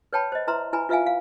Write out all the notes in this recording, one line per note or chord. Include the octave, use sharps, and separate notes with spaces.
B4 C#5 G5 A5 B5
C5 D#5
E4 B4 E5 A#5 C6
E4 B4 G#5 A#5 B5
F4 B4 E5 F5 G#5
F5